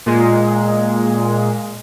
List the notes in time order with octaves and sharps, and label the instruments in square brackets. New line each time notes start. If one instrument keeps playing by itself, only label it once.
[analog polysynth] A#2 G#3